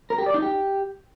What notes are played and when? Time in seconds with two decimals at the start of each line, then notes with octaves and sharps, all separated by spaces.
0.10 A#4
0.18 G4
0.26 D5
0.34 D#4
0.42 G4